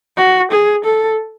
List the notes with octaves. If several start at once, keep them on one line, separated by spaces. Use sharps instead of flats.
F#4
G#4
A4